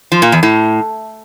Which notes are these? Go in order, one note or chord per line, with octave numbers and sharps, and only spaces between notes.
F3
A#2
E2
A2